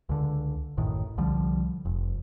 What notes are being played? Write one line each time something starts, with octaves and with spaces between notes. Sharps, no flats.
C#2 D3
A1 F#2 A2 D#3
C2 D3 F3 G3
F1